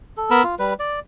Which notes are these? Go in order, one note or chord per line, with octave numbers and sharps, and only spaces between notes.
A4
B3 A#4 B5 E6
F4
G3 B4
D5